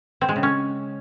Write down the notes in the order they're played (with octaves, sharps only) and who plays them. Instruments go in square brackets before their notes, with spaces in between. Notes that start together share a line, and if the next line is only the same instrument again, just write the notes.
[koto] C4
G#3
C#3
C#4